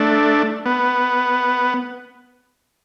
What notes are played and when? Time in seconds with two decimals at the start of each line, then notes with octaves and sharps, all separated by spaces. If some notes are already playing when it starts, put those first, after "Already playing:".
Already playing: A3 D4
0.66 B3